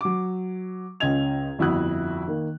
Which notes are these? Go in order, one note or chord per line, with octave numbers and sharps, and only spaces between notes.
F#3 D6
C#2 C#4 F4 D#5 G#6 F7
G1 F2 E4 F#4 D#6 F#6
D#3 A#3